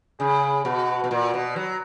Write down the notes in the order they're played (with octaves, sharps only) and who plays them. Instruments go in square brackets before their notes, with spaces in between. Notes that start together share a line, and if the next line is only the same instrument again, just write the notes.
[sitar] C#3 [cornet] G#4
[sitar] B2 [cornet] F#4
[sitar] B2
[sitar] A#2 [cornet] F#4
[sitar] B2
F#3